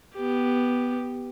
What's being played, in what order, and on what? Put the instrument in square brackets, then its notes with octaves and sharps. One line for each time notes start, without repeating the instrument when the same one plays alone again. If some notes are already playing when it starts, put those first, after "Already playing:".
[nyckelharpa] B3 G4